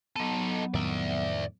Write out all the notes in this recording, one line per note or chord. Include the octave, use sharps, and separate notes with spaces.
F#3 B3 D#4 A4
F2 A2 D#3 D5 E5